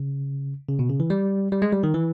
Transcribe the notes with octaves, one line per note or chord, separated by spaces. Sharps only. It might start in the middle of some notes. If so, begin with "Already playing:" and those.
Already playing: C#3
C#3
B2
C#3
E3
G3
G3
G#3
G3
D#3
E3